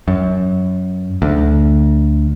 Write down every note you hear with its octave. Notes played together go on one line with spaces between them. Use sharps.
F#2
D2